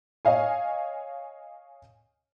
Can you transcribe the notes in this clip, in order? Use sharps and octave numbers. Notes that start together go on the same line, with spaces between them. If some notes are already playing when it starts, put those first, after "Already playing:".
C#5 D#5 F5 G#5